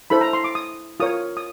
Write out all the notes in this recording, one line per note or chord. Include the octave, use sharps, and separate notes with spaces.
E4 A4 C5 B5
A#5
C6
D6
D#6
F4 A#4 C#5 D#6
D#6